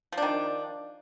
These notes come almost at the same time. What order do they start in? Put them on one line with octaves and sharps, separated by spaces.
F3 D4 D#3